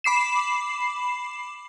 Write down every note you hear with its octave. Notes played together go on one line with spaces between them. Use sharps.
B5 D6 C7 E7